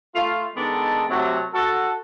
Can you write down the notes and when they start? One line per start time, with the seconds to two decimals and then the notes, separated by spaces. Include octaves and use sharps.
0.14 A3 F4
0.56 D#3 G#3 B3 D4 D#4 A4
1.09 C3 F#3 A3
1.54 F#4 A4